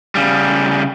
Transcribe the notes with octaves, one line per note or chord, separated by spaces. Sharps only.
C#3 G3